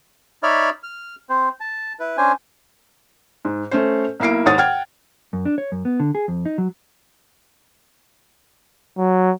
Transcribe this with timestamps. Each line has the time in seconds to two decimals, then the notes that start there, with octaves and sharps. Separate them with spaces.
0.43 D#4 C#5 D5 E5 B5 F6
0.83 F6
1.29 C4 C5
1.60 A5
2.00 E4 B4
2.17 C#4 D4 C5 G#5
3.45 G#2
3.71 A3 C#4 C5
4.20 B1 A#3 E4 C7 D7
4.46 D#2 G#2 C#5 F#5 D#6 A6
4.58 F#5 G5 F6 G#6
5.33 F#2
5.45 D4
5.58 C#5
5.72 F#2
5.85 B3
6.00 D3
6.15 G#4
6.28 F2
6.45 D#4
6.58 F#3
8.98 F#3